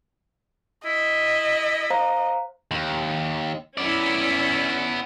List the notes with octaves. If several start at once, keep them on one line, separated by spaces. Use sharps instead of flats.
E4 D#5
C5 F5 A#5
D#2
B3 C#4 E4 D5